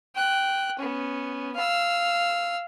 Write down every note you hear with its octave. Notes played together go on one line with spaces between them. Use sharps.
G5 F#6
B3 C#4
F5 E6